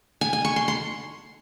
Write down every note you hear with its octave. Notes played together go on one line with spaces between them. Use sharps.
G#5
G#5
C#6
C6
C6